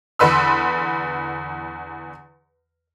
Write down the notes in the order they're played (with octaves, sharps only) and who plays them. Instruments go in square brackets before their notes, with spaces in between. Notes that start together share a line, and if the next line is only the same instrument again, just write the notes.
[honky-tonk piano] E2 D3 B4 C6 E6